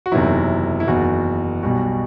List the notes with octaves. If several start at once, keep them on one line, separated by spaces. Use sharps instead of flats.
F#4
F#1 E2 C3 D#3 F#3 E4
E4
F#1 E2 D#3 F#4
B1 B2 G3 F#4